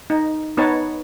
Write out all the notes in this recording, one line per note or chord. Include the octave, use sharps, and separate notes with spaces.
D#4
B3 D#4 B4 C#5 A5